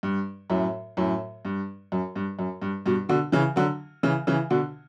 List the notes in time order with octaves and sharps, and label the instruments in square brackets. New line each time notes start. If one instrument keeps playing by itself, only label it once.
[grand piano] G2
F#2 A2
F#2 A2
G2
F#2
G2
F#2
G2
G2 B2
B2 D3
C#3 E3
D3 F#3
C#3 E3
C#3 E3
B2 D3